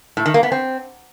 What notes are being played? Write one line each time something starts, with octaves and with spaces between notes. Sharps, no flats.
A2
D#3
A#3
B3
C4